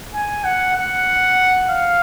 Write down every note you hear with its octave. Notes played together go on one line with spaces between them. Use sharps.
G#5
F#5
F#5
F5